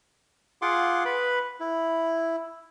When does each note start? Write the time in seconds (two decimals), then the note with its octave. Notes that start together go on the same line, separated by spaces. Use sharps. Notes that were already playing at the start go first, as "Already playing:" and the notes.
0.62 F4 G#4 F#5 C6 D6
1.05 B4 B5
1.60 E4